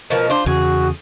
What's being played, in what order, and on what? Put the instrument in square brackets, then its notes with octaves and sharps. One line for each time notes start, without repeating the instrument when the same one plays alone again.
[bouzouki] B2 F3 [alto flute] A#4
[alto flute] D4 [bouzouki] F4 C5
[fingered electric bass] E2 C#3 [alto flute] F#4 [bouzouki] G#4